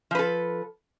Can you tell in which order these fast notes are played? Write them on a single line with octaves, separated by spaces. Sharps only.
F3 B4 A4